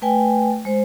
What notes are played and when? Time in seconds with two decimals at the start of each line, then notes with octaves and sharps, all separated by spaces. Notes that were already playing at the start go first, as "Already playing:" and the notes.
0.02 A3 B4 G5 G#5
0.65 G#3 C5